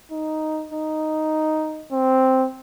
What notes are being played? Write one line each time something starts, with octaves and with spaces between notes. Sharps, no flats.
D#4
D#4
C4